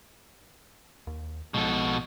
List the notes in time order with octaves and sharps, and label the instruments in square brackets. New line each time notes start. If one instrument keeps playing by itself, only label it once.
[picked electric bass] D#2
[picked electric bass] B1 F3 G#3 [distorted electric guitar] B2 A4